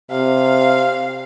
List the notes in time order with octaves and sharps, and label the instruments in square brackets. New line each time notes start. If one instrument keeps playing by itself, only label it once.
[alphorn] C3 [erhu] F5